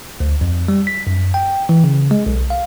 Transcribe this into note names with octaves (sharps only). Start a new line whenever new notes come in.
D2
F2
G3
B6
F#2
G5
E3
C#3
G#3
B1
F5